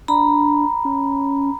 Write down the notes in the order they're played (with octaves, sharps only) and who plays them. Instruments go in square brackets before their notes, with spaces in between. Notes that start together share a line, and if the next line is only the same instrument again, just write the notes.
[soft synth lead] D4 [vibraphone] A#5 B5
[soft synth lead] C#4